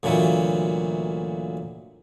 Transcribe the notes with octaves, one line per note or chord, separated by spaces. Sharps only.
D2 A#2 E3 F#3 A#3